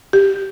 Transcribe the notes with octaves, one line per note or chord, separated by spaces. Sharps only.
G4